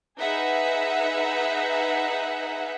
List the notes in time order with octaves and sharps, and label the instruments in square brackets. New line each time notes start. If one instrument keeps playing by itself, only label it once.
[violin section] D#4 G#4 B4 E5 F#5